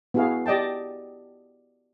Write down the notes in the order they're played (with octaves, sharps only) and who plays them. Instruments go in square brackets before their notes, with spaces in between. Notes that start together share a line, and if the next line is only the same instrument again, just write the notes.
[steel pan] B3 E4 F#4 G#4 F5
G4 D5 D#5 G5 A5